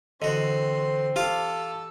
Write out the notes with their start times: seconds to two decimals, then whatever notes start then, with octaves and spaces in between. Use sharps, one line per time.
0.22 D3 E3 C4 F#4 D#5 C6
1.16 F4 G4 A4 F5 D6